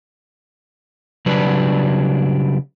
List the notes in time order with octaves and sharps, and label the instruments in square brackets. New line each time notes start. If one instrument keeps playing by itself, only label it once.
[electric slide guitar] C#3 F#3 G3 D4 B4